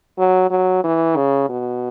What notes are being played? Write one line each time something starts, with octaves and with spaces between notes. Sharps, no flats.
F#3
F#3
E3
C#3
B2